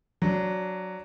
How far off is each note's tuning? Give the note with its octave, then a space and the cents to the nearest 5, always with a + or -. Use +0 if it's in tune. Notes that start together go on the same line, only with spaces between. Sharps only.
F#3 +0 D4 -15